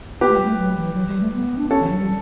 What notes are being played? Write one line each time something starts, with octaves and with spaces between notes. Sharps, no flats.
B3 G4 B4
A3
G3
A3
F#3
E3
F#3
G3
A3
B3
D4
C#4 A4 C#5
E3
F#3
G3